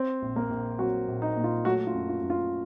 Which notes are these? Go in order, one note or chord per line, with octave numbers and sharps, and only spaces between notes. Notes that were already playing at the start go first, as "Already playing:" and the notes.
Already playing: C4 C5
A#1
A#3 A#4
A#1
F#3 C4 F#4
A#1
D#4
A#2
F4
F#3 A3 F#4
F4
F#2
F4
F#2
F4